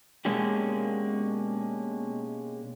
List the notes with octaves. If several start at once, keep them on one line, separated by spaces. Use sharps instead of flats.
B2 G#3 A#3 C#4 D4 G4